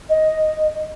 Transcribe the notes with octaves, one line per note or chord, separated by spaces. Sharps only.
D#5